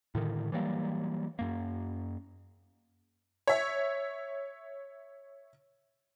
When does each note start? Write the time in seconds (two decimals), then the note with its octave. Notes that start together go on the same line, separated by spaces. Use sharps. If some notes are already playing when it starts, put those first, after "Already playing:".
0.15 A2 D3 D#3
0.52 E3 F#3 G3 A#3
1.39 F#2 A#3
3.47 C#5 E5